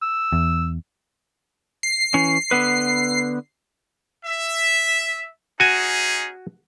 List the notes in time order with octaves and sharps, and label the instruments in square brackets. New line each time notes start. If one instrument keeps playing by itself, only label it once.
[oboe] E6
[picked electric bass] E2
[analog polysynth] C7
[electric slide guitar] E3 C#4
D3 B3 B4
[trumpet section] E5
[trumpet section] C#4 D#4 G#4 [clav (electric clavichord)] F#4 G#5